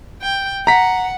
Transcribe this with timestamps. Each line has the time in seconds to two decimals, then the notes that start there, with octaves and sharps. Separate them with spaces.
0.22 G5
0.67 F#5 A#5 B6